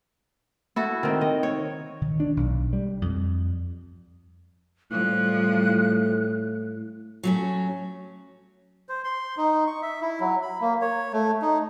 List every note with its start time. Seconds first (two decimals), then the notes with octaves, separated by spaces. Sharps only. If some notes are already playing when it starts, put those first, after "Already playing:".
0.76 E4 F#4 A4
1.03 D#3 C4
1.21 D#5
1.43 C#5
2.02 D#3
2.20 D4
2.37 B1
2.73 G3
3.02 F2
4.91 A2 F3 G3 F#6
7.23 F#3 A3 C#4
8.89 C5
9.04 C6
9.37 D#4
9.67 C#6
9.82 E5
10.02 E4
10.20 F#3
10.42 B5
10.61 A#3
10.82 C#5
11.13 A3
11.42 D#4